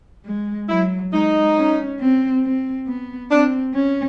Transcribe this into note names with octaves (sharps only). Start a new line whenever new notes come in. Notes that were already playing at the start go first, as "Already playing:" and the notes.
G#3
F#3 E4
G#3 D#4
C#4
C4
C4
B3
C4 D4
C#4